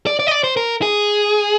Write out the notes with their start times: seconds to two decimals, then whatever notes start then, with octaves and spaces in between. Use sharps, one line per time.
0.07 D5
0.19 D5
0.27 D#5
0.31 D5
0.44 C5
0.57 A#4
0.82 G#4